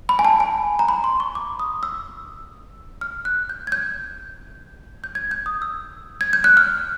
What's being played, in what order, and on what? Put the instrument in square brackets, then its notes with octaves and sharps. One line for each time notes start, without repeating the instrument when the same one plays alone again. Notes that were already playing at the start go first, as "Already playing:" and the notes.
[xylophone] B5
G#5
A5
G#5
A#5
B5
C6
C#6
D6
D#6
E6
F6
F#6
G6
G#6
G6
G6
G#6
G6
D#6
E6
G#6
G6
F#6
F6